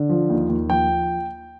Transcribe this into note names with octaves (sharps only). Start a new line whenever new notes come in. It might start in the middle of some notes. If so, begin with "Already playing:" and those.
Already playing: D3
F3
D#2
D#2
F3 G5